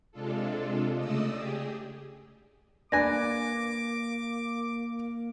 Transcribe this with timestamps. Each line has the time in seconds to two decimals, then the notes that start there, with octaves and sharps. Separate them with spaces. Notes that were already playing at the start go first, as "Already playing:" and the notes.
0.11 C3 G#3 D4 F4 A4
0.98 C#3 A3 D5 D#5 D#6 E6
1.33 G4 G#4
2.92 A#3 D4 B4 G#5 D6 A#6